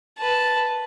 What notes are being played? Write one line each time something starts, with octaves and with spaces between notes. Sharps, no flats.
B4 A5